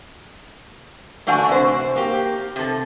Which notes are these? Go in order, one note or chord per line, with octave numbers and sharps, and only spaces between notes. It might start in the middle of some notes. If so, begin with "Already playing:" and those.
D3 A3 D4 F#4 F#5 G#5
C3 C5
A#3 G4
C3 A4